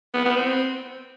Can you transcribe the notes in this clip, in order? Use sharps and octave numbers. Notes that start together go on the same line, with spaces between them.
B3
B3
C4